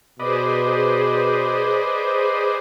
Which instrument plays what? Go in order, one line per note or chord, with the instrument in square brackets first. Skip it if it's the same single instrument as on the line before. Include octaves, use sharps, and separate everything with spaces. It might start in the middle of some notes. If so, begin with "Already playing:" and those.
[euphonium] B2 [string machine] G#4 C5 [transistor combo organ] B4 D5 D#5